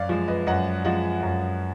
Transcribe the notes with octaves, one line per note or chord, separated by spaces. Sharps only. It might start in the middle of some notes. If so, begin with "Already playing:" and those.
Already playing: F#2 D5 F5
F3 G#3
B4 D#5
F#2 D#5 F#5
F3 G#3 D#5 F#5
F#2